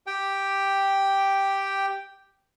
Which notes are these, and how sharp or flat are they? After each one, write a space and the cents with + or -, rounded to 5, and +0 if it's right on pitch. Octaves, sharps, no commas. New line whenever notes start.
G4 +0 G5 +0